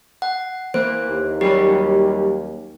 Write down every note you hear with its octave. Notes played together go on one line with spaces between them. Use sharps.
F#5
E3 A#3 C5
D#2
F#3 G3 C#4 G4